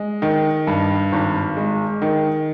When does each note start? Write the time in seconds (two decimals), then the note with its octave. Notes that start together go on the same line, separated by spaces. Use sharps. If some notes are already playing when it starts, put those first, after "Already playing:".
Already playing: G#3
0.22 D#3
0.67 G2
1.12 G#1
1.57 G#3
2.02 D#3